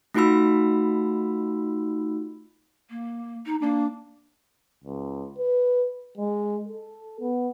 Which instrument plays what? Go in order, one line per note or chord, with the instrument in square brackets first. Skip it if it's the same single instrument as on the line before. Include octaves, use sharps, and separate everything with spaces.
[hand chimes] A3 D#4 F4 F#4 B5 E6
[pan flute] A#3
D#4
[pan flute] A#3 [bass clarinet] D4
[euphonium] C#2
B4
G#3
A4
B3